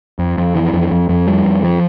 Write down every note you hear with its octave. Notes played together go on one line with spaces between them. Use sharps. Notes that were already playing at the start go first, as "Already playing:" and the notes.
F2
F2
E3
F2
F2
F2
G3
F2
F3